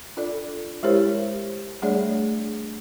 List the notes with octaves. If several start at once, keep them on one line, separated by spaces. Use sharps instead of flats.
D4 F4 A4 D5
G#3 E4 G4 A#4 C5 C#5
G3 A3 D4 G#4 C#5 D5